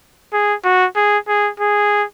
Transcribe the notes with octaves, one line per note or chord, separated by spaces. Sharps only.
G#4
F#4
G#4
G#4
G#4